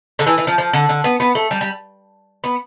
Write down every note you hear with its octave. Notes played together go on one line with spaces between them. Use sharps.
D3
E3
E3
F3
F3
D3
D3
B3
B3
A3
G3
G3
B3